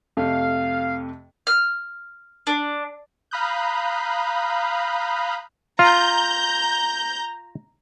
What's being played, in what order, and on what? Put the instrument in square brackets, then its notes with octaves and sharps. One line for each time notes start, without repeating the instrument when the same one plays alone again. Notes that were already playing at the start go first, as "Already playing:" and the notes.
[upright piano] F2 C3 A3 [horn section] F5
[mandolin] F6
D4
[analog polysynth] F5 A#5 B5 D#6 F#6 G6
[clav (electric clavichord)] F4 [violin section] A#5 G6